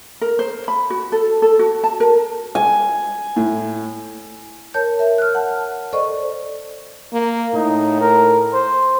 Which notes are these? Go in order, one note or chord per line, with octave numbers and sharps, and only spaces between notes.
A#4
C5
B5
F#4
A4
A4
F#4
A5
A#4
G#5
A2
A#4 C#5 A5 G6
A#4 E5
F6 F#6
F#5 A5
A4 C5 D5 D#5 C#6
A#3
A2 D#4
A#4
C5